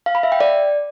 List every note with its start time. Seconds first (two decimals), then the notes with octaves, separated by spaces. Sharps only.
0.06 F5
0.15 B5
0.23 E5
0.32 G5
0.40 D5